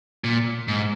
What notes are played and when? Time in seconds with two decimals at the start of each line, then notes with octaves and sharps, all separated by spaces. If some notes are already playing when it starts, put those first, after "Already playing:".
0.24 A#2
0.68 G#2